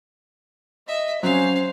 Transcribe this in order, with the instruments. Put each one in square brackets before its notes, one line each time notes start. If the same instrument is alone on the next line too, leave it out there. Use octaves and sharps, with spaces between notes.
[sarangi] D#5 [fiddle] E5
[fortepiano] F#3 [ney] C#4 [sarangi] C5 [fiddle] F5